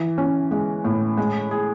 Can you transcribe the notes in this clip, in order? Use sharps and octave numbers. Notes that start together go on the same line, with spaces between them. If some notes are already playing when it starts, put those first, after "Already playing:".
Already playing: E3
C#4
G#3
A2
G#3
G#4